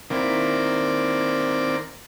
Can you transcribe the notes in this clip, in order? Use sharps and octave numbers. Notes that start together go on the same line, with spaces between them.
D#3 A#3 C4 E4 A#4 D5